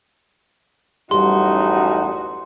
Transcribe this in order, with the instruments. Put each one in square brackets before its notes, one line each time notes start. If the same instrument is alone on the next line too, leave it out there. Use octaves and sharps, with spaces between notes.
[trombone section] A1 F#2 D#4 [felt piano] G3 [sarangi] F#4 [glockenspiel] C6